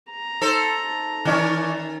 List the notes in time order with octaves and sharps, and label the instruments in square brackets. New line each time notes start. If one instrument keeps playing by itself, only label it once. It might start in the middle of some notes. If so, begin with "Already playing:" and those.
[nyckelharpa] A#5
[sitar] D#4 A4 C5
[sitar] D#3 C#4 [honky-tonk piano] E3 D5 C#6